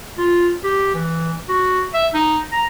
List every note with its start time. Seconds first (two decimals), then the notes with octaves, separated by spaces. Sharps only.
0.18 F4
0.64 G4
0.94 E3
1.49 F#4
1.94 E5
2.14 D#4
2.52 A#5